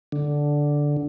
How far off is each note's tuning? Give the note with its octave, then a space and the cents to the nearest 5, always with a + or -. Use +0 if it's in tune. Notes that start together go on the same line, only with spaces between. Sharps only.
D3 -5